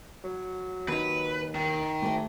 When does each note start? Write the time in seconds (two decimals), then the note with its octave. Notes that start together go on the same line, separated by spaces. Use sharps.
0.24 F#3
0.88 D#2 D#4 B4
1.55 D#3
2.02 D2 G#2 A3